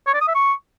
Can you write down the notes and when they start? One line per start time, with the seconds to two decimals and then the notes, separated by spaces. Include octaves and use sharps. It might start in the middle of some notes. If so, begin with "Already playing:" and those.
0.07 C#5
0.14 D5
0.21 D#6
0.28 E5
0.35 C#6